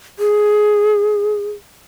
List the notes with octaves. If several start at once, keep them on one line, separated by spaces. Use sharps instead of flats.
G#4